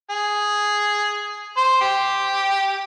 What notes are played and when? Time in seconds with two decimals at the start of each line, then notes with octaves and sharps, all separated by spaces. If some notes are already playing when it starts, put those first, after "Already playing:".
0.10 G#4
1.57 C5
1.81 G4